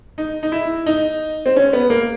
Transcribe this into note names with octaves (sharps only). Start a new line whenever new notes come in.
D#4
D#4
E4
D#4
C4
C#4
B3
A#3